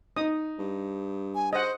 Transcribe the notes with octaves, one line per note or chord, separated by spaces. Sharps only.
D#4 D#6
G2
G#5
C5 D#5 F#5